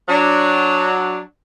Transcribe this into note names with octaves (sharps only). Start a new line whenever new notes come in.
F#3 D4